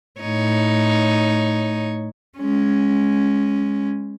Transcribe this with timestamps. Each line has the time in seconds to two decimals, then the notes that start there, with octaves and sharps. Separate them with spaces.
0.21 A2 D#4 C#5
2.38 G#3 C#4